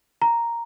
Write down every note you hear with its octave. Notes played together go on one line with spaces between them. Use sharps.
A#5